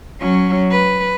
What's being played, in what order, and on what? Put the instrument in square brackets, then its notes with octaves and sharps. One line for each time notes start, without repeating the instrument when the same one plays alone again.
[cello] F#3 C#4
B4